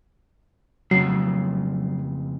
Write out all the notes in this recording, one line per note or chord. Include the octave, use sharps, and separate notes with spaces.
F2 C#3 F#3 C7